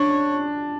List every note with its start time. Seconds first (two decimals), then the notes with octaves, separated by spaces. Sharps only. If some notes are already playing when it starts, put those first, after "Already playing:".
Already playing: D4 C#5